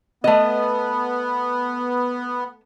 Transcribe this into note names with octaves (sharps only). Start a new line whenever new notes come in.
A3 B3 D#5